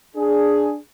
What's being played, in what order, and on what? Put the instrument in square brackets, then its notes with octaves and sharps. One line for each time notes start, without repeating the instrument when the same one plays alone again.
[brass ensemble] D4 G#4